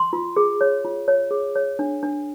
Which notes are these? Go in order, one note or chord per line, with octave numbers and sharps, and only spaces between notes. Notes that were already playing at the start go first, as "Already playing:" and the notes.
Already playing: C6
F4
G#4
C#5
F4
C#5
G#4
C#5
D4
D4